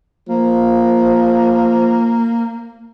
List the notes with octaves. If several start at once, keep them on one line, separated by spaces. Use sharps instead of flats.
F3 A#3